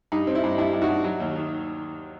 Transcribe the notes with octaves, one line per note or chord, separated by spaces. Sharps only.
G2 D#4
C4
E4
G2
G2 E4
G2
D#4 F#4
G2
F#3
D#2
D#3